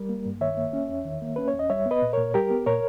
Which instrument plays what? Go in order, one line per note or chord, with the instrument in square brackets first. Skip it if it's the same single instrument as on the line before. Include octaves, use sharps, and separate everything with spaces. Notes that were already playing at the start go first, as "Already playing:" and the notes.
Already playing: [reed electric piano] G3 A#4
A#3
G2
D#3 C#5 E5
A#3
C#4
E2
D#3
A#3
C#4 B4
C#5
E2
D#5
G3 C#5 E5
B3
B4 D#5
A#2
A#2 A#4 C#5
G3 G4 A#4
B3
A#2 A#4 C#5